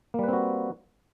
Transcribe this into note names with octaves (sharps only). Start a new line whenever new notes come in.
G3 A#3 C4 F#4 B4